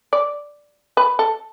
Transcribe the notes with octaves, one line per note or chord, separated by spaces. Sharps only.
D5
B4
A4